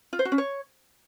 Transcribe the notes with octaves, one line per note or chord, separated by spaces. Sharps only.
F4
C5
F#4
C#4
C#5